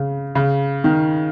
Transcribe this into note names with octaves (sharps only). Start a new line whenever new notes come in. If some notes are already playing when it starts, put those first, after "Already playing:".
Already playing: C#3
C#3
D#3